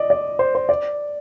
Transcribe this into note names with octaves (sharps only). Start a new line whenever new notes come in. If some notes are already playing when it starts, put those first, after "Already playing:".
Already playing: D5 D#5
D5
C5
C5
D5